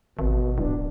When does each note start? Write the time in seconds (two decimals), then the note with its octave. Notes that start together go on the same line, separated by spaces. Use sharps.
0.19 G#1 B2
0.58 D1 D4